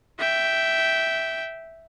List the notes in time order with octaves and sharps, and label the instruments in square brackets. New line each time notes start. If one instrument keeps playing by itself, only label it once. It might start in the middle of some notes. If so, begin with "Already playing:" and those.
[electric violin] E5 G5